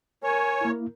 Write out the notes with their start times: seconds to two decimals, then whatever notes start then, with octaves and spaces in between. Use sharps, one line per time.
0.23 A#4 C#5 G#5
0.61 A#3 E4